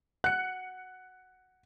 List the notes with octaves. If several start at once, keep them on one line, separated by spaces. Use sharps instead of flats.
F#5 F#6 C#7